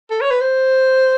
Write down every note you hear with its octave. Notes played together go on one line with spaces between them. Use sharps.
A4
C#5
B4
C5